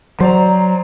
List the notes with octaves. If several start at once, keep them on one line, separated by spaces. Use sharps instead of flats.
F#3 C5 D5 A#5